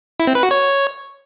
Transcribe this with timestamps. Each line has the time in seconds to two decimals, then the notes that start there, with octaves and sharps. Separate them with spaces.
0.20 E4
0.27 C4
0.35 B4
0.43 F#4
0.51 C#5